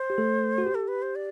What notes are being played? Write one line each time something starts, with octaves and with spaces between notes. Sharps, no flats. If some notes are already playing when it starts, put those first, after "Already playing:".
Already playing: C5
G4
A3 A4
F#4
G4
A4
B4
C5
D5